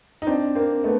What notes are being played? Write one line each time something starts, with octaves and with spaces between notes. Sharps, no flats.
D#4
C4 D4
A#3 C4
A3 B3